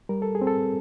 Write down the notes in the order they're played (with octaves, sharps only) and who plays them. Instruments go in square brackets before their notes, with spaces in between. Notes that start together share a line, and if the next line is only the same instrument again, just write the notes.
[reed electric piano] G3 A#4
A4
G#4
C4
A4